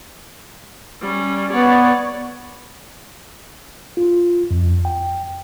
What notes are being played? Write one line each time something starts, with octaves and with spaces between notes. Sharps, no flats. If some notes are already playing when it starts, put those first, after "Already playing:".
G3 C#4
B3 C#5 D5
F4
F2
G5